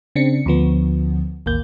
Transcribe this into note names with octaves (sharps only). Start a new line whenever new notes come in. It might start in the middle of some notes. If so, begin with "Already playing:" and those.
C#3 C4 D4 C#7
D2 D3 F3 B3
A1 D#2 A#3 G6